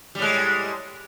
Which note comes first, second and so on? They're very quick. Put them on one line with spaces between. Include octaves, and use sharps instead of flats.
G3 A2 G#3